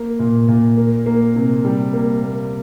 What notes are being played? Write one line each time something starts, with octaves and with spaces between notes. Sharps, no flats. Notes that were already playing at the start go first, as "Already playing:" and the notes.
Already playing: A#3
A#2
A#2
A#3
A#3
C3
G3
A#3
A#3